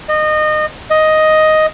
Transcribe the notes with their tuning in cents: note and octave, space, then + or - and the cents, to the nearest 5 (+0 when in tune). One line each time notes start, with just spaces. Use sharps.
D#5 -25
D#5 +5